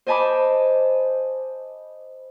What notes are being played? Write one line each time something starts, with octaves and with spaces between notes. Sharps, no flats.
C5 D#5 G#5 A5 B5 D6